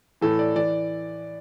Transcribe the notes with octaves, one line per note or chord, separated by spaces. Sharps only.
A2 E3 A4
D5
E3 D5